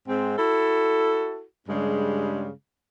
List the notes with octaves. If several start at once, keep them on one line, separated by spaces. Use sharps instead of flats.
G#2 C4
E4 F#4 A4
G2 C#3 G3 G#3